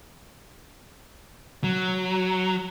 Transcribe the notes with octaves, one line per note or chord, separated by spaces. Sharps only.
F#3